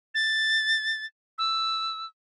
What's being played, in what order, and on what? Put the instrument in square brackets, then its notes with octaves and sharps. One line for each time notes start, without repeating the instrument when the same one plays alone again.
[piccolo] A6
E6